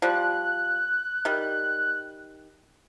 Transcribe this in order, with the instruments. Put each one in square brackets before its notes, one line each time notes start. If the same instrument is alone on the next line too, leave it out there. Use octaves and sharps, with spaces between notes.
[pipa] F3 G3 [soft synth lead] F#6
[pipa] D#3 G3